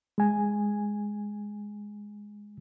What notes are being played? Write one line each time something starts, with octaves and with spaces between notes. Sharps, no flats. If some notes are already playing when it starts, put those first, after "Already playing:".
G#3 G#5